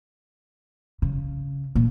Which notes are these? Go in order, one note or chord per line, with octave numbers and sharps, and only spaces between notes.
C#3
A#2